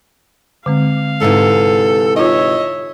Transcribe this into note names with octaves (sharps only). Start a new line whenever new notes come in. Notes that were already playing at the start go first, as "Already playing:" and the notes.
D3 G#3 C4 F5
G#2 C3 E3 A4
D#4 F4 C#5 D#5 E5